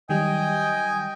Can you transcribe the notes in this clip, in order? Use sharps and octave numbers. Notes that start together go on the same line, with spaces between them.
D#3 F#3 G3 D#5 G5 G#5